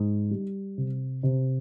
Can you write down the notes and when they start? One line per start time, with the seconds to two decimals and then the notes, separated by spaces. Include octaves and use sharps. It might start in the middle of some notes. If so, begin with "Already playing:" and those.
Already playing: G#2 D#4
0.31 G3
0.78 C3
1.23 C3